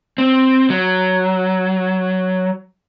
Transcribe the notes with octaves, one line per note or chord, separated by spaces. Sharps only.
C4
F#3